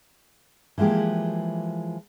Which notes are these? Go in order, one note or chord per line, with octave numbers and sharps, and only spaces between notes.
E3 F3 G#3 A#3 G4